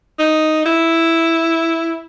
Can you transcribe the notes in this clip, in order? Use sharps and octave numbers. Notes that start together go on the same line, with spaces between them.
D#4
E4